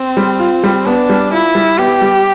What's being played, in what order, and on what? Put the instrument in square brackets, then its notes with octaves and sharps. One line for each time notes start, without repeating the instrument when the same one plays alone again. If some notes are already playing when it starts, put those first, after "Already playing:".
Already playing: [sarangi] C4
[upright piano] G3
F4
G3
[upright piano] B3 [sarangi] D4
[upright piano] G3
[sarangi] E4 [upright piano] F4
[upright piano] G3
[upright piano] B3 [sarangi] G4
[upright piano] G3